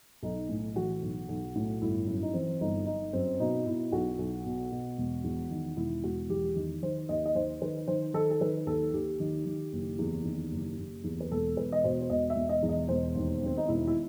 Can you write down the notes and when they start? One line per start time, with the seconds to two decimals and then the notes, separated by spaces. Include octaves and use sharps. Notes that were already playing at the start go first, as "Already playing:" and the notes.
0.23 B1 D#4
0.49 A2
0.76 E3 F#4
1.02 B1
1.29 B1
1.55 A2
1.82 G1 E4
2.07 F#2 E4
2.22 D#4
2.34 E3 C4
2.61 G1 D#4
2.86 G1 D#4
3.13 F#2 C4
3.40 B2 D#4
3.66 B2 E4
3.92 B1 F#4
4.18 B1
4.46 B2
4.72 B2
4.98 E1
5.24 E2
5.51 D#3
5.77 E1 E4
6.04 E1 F#4
6.30 E2 G4
6.56 D#3
6.82 D#3 C5
7.09 D#2 D#5
7.25 D#5
7.35 D#2 C5
7.62 D#3 B4
7.87 D#3 C5
8.14 D#3 A4
8.31 A4
8.41 D#3 B4
8.67 D#2 A4
8.93 D#2 G4
9.20 D#3
9.46 D#3
9.73 F#1
9.99 E2
10.25 D#3
10.52 F#1
10.78 F#1
11.04 E2
11.21 B4
11.31 E1 A4
11.57 E2 B4
11.72 D#5
11.84 B2 C5
12.01 C5
12.10 E1 D#5
12.30 E5
12.36 E1
12.49 D#5
12.63 E2
12.69 D#5
12.89 E1 C5
13.15 D#2
13.42 D#3 C4
13.57 D#4
13.68 E1 E4
13.87 E4